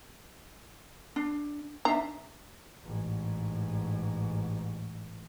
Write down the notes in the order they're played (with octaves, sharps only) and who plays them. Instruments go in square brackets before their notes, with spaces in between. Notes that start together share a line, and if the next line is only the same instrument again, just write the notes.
[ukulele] D4
[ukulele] D4 D#4 E5 [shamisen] A#5
[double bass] A1 G#2